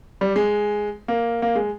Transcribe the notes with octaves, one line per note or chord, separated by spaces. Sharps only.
G3
G#3
A#3
A#3
G#3